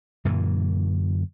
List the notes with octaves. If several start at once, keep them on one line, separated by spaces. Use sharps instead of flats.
F#2 A#2 D3 E3